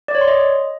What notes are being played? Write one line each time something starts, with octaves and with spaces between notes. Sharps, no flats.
D5
C#5
C6
D#5